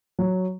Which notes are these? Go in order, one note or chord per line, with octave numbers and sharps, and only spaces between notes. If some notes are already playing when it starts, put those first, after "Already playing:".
F#3